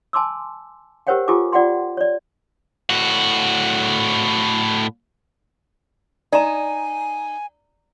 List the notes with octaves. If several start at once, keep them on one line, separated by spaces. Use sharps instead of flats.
G#5 A5 C6 D6 E6
G4 A#4 C5 C#5 F#5 G5
F4 G4 A4 G#5 D6
F4 D5 F#5 G5 C6
C#5 D5
A2 F#4
D#4 D5 G#5 A#5